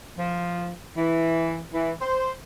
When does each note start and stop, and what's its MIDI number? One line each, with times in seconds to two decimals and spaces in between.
0.18 0.71 53
0.97 1.60 52
1.73 1.91 52
2.02 2.33 72